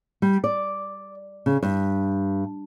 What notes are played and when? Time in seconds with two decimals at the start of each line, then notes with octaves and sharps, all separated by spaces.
0.22 G3
0.44 D5
1.46 C#3
1.63 G2